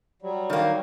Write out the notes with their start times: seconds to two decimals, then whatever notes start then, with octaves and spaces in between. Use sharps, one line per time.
0.22 F#3 G3
0.50 D#3 A#3